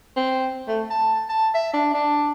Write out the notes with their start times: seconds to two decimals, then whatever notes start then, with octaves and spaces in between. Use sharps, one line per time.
0.17 C4
0.68 A3
0.91 A5
1.29 A5
1.55 E5
1.74 D4
1.94 D4